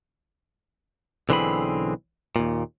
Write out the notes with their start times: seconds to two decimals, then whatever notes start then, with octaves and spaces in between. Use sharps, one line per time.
1.29 B1 D3 E3 C4 G#4 B5
2.36 D#2 A#2